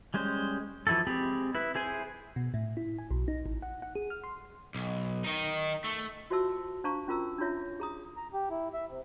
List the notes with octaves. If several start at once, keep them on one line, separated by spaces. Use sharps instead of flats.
G3 G#3 C#4 C5
E3 F3 E4 F#4 A4
G#3 C4 G4 G#4 B5
E4 B4
E4 G#4 C5 G#5
B2
A2
E4
G#5
B1
D#4
A1
F#5
F#5
G#4
F6
C6
B1
D#3 D#4
A3
F4 F#4 C5 E5 A5 E6
D4 C5 F5 A5 A#5 C#6
C#4 F4 A#4 A#5 E6
D4 E4 F4 C#5 E5
G#4 A#5 D#6
A#5
G4
E4
E5
C3